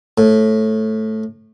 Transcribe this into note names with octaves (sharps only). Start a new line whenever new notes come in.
A2